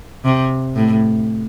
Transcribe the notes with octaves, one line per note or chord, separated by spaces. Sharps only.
C3
A2